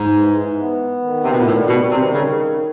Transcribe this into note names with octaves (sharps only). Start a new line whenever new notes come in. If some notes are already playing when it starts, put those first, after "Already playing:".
Already playing: G#2
E3
B3
D#3
C3
B2
A#2
A2 G3
B2
C3 D#3
C#3